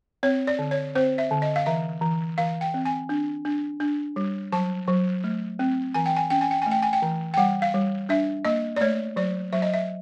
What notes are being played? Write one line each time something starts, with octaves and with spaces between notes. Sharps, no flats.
C4 C#5
D5
D3
C#5
C4 C5
E5
D3
D#5
F5
E3 E5
E3
E3 F5
G5
C4
G#5
D4
D4
D4
G3
F#3 A5
F#3
A3
C4
E3 G#5
G5
G#5
C#4 G5
G#5
G5
A3 G#5
G5
G#5
G5
E3
G5
G3 F#5
F5
G3
D4 E5
A#3 D#5
D5
A3 C#5
F#3 D5
F#3 E5
D#5
E5